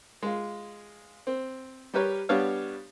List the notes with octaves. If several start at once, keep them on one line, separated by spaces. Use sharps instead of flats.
G#3 F4
C4
G3 G4 A#4 B4 C#5
G3 B3 D4 G4 C#5 F5